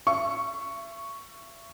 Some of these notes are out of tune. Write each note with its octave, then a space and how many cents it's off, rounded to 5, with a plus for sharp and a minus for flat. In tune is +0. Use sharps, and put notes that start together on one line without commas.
E5 +35 C#6 +0